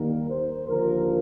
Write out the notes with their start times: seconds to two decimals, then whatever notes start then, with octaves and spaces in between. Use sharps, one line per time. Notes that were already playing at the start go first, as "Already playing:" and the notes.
Already playing: D#2 D#3 G3 A#3 A#4
0.29 C5
0.68 D#2 D3 F3 A#4